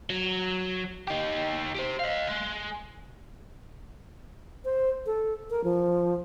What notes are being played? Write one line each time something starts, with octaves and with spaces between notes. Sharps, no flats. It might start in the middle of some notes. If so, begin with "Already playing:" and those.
F#3
D#4 G4
G4 C5
D#5 F5
G#3
C5
A4
A#4
F3